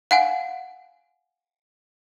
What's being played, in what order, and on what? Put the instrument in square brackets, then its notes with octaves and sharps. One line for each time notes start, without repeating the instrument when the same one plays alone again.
[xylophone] F5 F#5 G#5